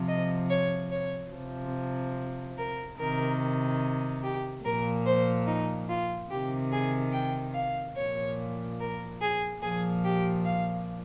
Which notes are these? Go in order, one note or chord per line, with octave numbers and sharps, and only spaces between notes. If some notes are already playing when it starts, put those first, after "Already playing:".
Already playing: C3 F3
D#5
C#5
C#5
C3 F3
A#4
C3 D#3 A#4
G4
A#2 F3 A#4
C5
D#4
F4
C3 D#3 G4
G#4
G5
F5
A#2 F3 C#5
A#4
G#4
A#2 F3 G#4
G4
F5